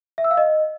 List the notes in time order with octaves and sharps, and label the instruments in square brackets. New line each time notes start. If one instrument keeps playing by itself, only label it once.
[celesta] E5
E6
F5
D#5